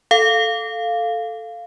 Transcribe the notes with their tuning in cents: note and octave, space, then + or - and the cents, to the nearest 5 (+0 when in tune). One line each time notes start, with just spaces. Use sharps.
A4 +0 F5 +0